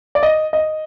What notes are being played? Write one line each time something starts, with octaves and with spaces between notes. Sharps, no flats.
D5
D#5
D#5